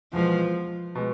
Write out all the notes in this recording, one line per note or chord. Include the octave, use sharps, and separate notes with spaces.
E2 B2 F3 G#3
B2 G#3